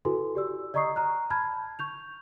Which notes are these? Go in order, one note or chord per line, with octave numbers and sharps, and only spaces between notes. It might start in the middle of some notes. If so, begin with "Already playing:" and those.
E4 F#4 A4 B4 G#5 C6
G4 D5 E6
D5 D#5 A#5 C#6 D#6 C7
A#5 F6 F#6
A5 B5 F6 G6 G#6
C#6 G6 F7